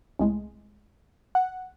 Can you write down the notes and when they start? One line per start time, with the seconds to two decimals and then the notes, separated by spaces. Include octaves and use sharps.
0.19 C2 A2 G#3
1.35 F#5